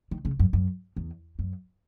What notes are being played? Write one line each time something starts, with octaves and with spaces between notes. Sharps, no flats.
D#3
C#3
F#2
F#2
E2
F#2